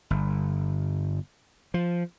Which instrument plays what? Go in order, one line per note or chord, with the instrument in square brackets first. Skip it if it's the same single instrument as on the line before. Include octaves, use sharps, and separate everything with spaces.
[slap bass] G1
F3